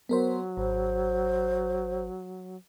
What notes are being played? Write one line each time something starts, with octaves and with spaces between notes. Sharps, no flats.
F#3 B3 A#4 C5
G#1 C5